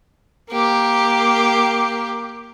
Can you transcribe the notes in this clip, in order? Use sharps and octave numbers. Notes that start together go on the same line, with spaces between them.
A#3 G4